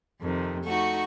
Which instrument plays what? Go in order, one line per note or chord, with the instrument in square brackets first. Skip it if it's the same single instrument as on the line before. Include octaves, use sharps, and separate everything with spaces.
[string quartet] F2 C3 D#3
[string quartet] A3 D#4 [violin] F#4 C#6